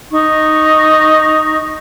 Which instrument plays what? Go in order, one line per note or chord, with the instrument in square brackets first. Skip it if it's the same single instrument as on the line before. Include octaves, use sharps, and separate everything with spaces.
[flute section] D#4 C#6